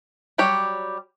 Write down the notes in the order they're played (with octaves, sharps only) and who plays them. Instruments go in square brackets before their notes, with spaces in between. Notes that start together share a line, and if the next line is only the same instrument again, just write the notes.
[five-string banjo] F#3 G3 G4 C#5